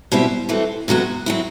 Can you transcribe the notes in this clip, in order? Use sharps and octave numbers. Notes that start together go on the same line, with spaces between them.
B2 G3 C4 E4
E3 A3 C4 F#4
D2 C3 F#3 B3 F#4
F#3 C4 E4